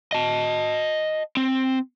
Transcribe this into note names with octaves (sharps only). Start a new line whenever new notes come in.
D#5 A5
C4